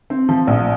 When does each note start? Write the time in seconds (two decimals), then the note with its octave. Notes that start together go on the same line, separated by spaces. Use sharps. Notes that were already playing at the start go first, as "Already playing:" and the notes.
0.10 C4
0.29 F3
0.47 A#1